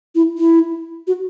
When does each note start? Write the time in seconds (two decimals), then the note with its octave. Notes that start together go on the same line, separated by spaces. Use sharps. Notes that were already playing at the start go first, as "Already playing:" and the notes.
0.14 E4
0.38 E4
1.07 F#4